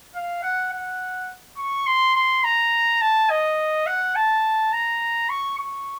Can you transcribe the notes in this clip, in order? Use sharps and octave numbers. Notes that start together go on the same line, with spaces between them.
F5
F#5
F#5
C#6
C6
C6
A#5
A5
D#5
F#5
A5
A#5
C#6
C#6